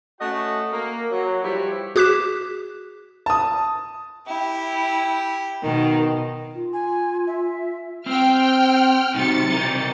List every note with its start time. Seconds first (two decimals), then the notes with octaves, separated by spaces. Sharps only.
0.20 A3 C#4 F#4 D#5 F#5
0.72 A#3
1.11 F#3
1.43 F3 G3 E4 G4 B4 C#5
1.96 F#4 G#4 D6 F#6 B6 E7
3.26 A5 D#6
4.28 E4 G4
5.61 B2 D#3
6.55 F4
6.73 G#5
7.27 E5
8.06 C4 G5 F6
9.15 C3 D#3 F#3 A6 C#7
9.50 E3 A#4